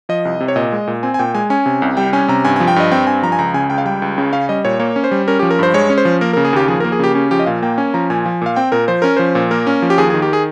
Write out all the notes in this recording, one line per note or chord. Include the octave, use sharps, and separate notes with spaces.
F3 D#5
C2
C3
C#5
A#2 D#5
G#3
A#2
C4 G#5
G#5
A#2 G5
G#3 G#5
C#4 G#5
C3
C2
G3 G5
C#4 G#5
C3 A#5
G2 G#5
G#5
F3
G5
G2 D#5
C4 G5
G2 G#5
F3 A#5
G#5
C#2 A#5
C#3 G#5
C#2 G5
F5
G3 G5
C#2
C#3
C#4 F5
G3 D#5
A#2 C#5
A#3 C#5
C#4
C5
G3
C#4 A#4
F3 G4
A#4
G2 C5
G#3 C#5
C#4
C5
F3
A#3 A#4
A#4
C#3
G#4
D#2 G4
F3 G#4
A#4
A#3
G#4
C#3 G4
C#4 G4
F3 G4
D#5
A#2 F5
A#3 G5
C#4 G#5
F3 A#5
A#2 G#5
F3
A#2 F5
C4 G5
A#2 A#4
F3 C5
C#4 A#4
F3 C5
A#2
A#3 A#4
C#4
F3
G4
D#2 G#4
G#4
D#3
G4
G#4